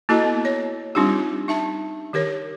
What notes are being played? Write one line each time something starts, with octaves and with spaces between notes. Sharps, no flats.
A#3 E4 F#4 A4 D#5 A#5
B3
C#5
G3 C4 D4 D#4 F4 G4
D#4 E5 A5
D#3 G4 A#4 C#5